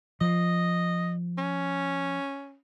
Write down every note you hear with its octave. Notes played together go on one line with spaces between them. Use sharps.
F3 D#5
C#4